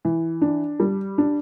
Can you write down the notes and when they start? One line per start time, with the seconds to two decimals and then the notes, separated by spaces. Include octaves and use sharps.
0.05 E3
0.41 D4
0.80 G3
1.18 D4